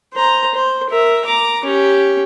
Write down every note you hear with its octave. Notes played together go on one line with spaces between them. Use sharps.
C5 A#5
C5
A#4 E5
A#5 D6
C#4 G4